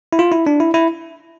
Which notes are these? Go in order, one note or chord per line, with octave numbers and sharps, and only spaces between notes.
E4
F4
E4
D4
E4
E4